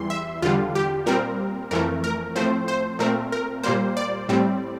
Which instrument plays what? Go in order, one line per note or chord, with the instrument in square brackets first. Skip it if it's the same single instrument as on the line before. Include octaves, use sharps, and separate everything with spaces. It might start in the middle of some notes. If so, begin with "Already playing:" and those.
Already playing: [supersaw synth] E2 E3 G3 C6
E5
E2 D3 G3 F4
G4
A#2 G3 C4 A#4
F2 E3 A3 A#4
A#4
A2 F3 A3 C4 C5
C5
A#2 A3 C4 A#4
A#4
A#2 G3 A#3 C5
D5
A2 G3 C4